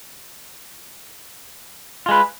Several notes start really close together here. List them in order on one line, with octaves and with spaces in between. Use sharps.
F4 G#3 B4